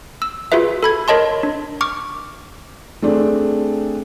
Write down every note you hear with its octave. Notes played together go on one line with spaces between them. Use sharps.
E6
F4 F#4 G#4 B4 E5
A4 B5 G#6
A#4 C#5 D#5 A5 C6
D4
C#6 D6 F6
A3 C4 D4 G#4